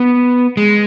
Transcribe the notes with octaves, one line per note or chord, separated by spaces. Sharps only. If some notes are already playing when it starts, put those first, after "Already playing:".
Already playing: B3
G#3